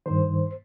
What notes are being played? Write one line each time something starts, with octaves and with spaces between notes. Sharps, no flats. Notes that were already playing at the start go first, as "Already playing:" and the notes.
G2 D#3 C5